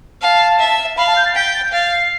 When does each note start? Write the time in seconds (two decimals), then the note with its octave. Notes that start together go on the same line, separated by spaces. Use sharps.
0.22 F5 A5
0.59 E5
0.97 F5 B5
1.07 A5
1.16 G6
1.26 A6
1.35 G5 B6
1.54 A6
1.63 G6
1.72 F5 A6
1.92 C7